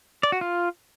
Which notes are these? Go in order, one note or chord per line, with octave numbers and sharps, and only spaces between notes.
D5
F#4
F4